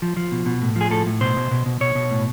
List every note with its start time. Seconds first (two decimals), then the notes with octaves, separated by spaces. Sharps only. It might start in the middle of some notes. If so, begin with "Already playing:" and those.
0.02 F3
0.17 F3
0.32 B2
0.46 B2
0.62 A2
0.76 F3 G#4
0.91 A2 A4
1.06 A2
1.21 B2 C5
1.37 B2
1.51 B2
1.66 B2
1.80 B2 C#5
1.95 B2
2.11 A2